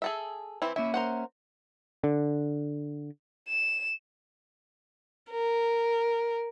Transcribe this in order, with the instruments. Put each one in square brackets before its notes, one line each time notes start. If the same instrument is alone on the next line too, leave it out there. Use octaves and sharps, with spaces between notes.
[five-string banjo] G#4 A4 E5
E3 C4 E4
[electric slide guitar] A#3 C#4 E5 [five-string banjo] E4
[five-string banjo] A#4 C5 F#5
[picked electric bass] D3
[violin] E7
A#4